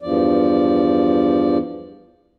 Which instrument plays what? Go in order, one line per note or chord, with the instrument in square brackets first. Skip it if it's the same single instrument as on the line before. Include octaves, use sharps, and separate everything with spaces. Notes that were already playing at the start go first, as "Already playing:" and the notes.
[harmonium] E2 G2 F3 D5